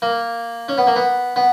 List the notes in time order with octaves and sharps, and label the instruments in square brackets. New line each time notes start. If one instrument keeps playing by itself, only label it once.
[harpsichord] A#3
C#4
B3
A#3
B3
B3